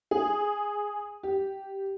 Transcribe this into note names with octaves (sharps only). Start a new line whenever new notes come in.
G#4
G4